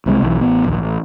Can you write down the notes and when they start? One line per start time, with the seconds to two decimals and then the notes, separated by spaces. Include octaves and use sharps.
0.06 C2 C3 G3 G#3
0.22 B1 E3
0.40 A1 B3
0.65 A#1 D#2
0.78 A1